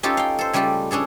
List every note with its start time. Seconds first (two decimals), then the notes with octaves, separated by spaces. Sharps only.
0.03 C#4 D#4 F4 G4 A4
0.17 F5 G5
0.39 A4 C5
0.53 C#3 G3 A3 F4 G4
0.91 C#4 D4 G#4 A4